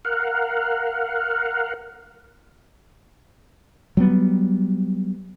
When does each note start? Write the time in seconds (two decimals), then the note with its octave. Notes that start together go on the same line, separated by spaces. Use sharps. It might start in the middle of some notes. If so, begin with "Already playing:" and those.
0.05 A#4 F5 F#5
3.97 F#3 G3 B3